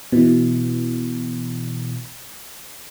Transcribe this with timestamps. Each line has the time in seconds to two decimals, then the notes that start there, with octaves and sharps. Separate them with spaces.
0.12 B2 E3